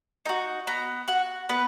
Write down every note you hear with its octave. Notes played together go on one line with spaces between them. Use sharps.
D#4 F#4 A#5
B3 A#5
F#4 F#5
B3 B4